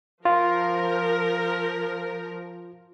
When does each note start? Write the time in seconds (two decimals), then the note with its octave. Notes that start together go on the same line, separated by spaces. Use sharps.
0.25 F3 F4 A#4